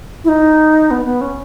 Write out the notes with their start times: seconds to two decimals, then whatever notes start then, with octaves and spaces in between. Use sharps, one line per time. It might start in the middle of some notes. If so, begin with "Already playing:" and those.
0.24 E4
0.29 D#4
0.91 B3
1.05 B3
1.21 C#4